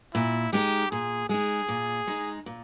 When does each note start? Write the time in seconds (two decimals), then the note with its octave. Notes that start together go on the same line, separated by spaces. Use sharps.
0.14 A#2 E4
0.52 G#3 D#4 G4
0.91 A#2 G#4
1.29 G#3 D#4 G#4
1.68 A#2
2.07 G#3 D#4
2.46 A#2